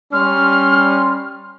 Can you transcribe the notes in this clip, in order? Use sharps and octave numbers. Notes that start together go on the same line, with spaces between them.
G3 C#4 C6 F6